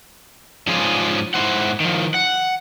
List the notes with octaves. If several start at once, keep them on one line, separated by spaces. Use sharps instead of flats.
G#2 F3 C#4 D4 F4 G#4
G#2 E4 C5 F#5
D#3 F3
F#5